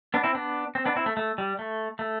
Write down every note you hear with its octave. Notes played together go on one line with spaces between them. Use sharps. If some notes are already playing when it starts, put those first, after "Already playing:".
B3 D4
C4 E4
B3 D4
C4
B3 D4
C4 E4
A3
A3
G3
A3
A3